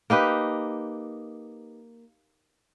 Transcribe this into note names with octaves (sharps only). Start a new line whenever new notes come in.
A#3 D#4 G4 B4